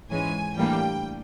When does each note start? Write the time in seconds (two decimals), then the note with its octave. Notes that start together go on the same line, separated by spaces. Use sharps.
0.10 G#2 E3 G#3 C#4 G#5
0.56 A2 E3 G3 A#3 D4 G5